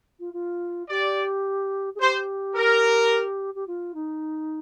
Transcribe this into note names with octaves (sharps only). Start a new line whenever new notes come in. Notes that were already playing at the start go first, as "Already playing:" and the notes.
F4
F4
G4 D5
G#4
G4 C5
A#4
G4
F4
D#4